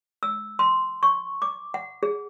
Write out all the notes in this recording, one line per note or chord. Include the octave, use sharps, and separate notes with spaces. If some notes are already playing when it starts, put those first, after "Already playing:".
E6
C6
C#6
D6
F#5
G#4